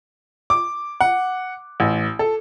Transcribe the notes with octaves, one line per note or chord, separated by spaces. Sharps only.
D6
F#5
A1
A4